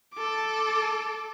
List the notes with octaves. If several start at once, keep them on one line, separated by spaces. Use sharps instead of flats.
A4 D6